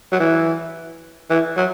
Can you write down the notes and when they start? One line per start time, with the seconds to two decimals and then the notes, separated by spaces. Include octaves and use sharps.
0.12 F#3
0.20 E3
1.30 E3
1.57 F#3